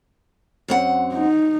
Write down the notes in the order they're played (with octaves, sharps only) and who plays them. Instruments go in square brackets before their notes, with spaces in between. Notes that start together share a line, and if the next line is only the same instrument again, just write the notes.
[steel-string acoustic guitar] F#2 C4 F#5
[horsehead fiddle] D#4